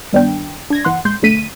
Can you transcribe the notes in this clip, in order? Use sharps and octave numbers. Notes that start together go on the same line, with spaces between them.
G2 D#3 G3 B3 D4 G5
D4 G#6 A#6
G1 E3 F#5 C6
A#1 G#3 C6 G6
B1 D3 A3 B6 D#7